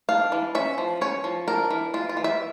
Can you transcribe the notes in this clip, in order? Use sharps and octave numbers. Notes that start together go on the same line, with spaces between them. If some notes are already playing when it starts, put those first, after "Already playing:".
D4 F5
E3
C#4 E5
F3
C#4 C#5
F3
D4 A#4
E3
E3 F4
F4
E3
E5